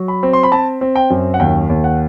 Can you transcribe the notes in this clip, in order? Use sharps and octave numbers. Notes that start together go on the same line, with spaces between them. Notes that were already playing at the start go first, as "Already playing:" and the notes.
Already playing: F#3
B5
C4
C6
B5
C4 A5
C4
G5
F#2
F#5
D#2 G5
D#2
F#5